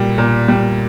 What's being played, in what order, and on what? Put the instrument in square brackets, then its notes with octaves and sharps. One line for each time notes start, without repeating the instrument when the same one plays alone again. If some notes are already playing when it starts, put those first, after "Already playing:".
Already playing: [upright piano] A#2 G3
A#2
G3